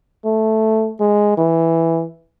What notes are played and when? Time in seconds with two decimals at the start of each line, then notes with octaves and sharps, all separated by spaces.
0.25 A3
1.00 G#3
1.38 E3